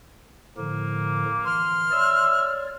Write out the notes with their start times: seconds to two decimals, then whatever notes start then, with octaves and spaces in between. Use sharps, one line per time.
0.57 A2 D3 F3 A#3
1.45 E3 C6 F6
1.91 C#5 D5 E5